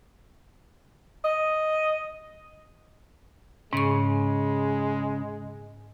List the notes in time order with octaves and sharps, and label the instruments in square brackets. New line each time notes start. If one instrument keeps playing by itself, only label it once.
[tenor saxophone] D#5
[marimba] G#2 C#6 [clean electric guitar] C#3 [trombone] G#3